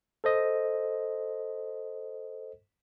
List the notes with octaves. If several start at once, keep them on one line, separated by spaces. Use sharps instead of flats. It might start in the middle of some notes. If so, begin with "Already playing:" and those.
A4 C5 D#5